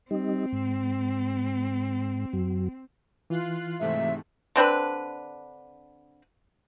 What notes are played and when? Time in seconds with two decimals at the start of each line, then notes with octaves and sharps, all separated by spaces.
0.11 G3 C4 D#4
0.53 G#2
2.33 F#2 F#3
3.30 E3 F4 F#6 C7
3.80 G#2 C3 A3 E5
4.56 D3 C4 D4 B4